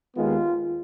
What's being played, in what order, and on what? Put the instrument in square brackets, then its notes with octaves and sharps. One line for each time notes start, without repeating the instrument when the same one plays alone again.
[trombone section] D#2 D#3 G#3 B3 F4